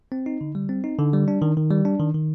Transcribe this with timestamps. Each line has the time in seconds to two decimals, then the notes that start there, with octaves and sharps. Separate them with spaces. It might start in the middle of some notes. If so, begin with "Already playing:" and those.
0.12 C4
0.26 D#4
0.41 D3
0.55 G3
0.69 C4
0.84 D#4
0.98 D3
1.13 G3
1.28 D4
1.42 D#3
1.57 D#3
1.71 G3
1.85 D4
1.99 D#3
2.14 D#3